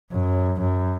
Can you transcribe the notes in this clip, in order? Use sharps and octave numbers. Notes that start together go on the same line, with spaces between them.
F#2
F#2